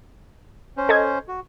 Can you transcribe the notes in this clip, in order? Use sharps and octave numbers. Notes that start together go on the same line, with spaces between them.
C#4 C5
A4 D#5 G#6
F#4